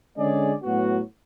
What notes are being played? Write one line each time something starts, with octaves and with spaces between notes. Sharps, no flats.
D3 G#3 C#4 G#4 D5
A2 F#3 B3 F#4